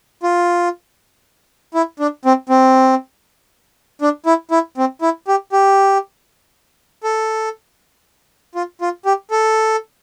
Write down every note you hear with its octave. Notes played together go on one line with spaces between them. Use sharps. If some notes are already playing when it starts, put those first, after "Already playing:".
F4
E4
D4
C4
C4
D4
E4
E4
C4
E4
G4
G4
A4
F4
F4
G4
A4